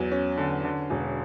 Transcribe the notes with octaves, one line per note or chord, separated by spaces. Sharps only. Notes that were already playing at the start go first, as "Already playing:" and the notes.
Already playing: E2 F#3
C#4
D3
D3
E1